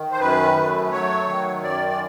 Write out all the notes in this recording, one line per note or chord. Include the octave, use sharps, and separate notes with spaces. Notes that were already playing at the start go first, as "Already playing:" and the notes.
Already playing: D#3
C5
F#2 B4
A3
F#3 C#5
D#3
F#2 D5
D5